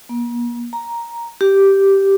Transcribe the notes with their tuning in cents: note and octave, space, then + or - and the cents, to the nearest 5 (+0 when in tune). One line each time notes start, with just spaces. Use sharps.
A#3 +40
A#5 +5
G4 -5